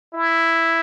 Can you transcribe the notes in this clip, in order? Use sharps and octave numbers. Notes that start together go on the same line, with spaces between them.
E4